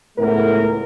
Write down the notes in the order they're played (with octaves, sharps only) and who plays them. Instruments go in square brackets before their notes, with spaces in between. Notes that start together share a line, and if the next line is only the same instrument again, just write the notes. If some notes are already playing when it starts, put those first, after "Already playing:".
[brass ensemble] C#2 A2 E3 A3 B3 A#4